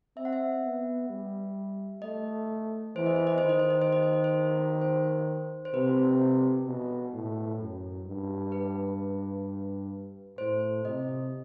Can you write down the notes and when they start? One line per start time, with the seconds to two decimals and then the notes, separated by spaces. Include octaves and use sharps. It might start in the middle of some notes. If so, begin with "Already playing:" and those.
0.17 C4 E5
0.25 F#5
0.33 E5
0.63 B3
1.09 G3
2.02 A3 D#5
2.96 E3 C5
3.06 D#5
3.16 C5
3.27 D#5
3.38 D#3 C5
3.49 D#5
3.60 C5
3.70 D#5
3.82 C5
3.92 D#5
4.03 C5
4.13 D#5
4.24 C5
4.82 C5
5.65 C5
5.74 C3 B4
6.66 B2
7.13 A2
7.60 F#2
8.06 G2
8.52 B4
10.38 A2 C5
10.85 C3 D#5